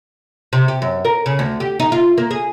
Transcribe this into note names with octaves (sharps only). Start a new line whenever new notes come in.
C3
G4
F#2
A#4
C#3
D2
G4
D#4
F4
A#3
G#4